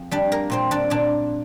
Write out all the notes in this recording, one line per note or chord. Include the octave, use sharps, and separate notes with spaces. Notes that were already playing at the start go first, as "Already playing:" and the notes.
Already playing: F2
G3 D4 D5
A#3 A#4
A#2 C4 C5
D4 D5
A#2 D4 D5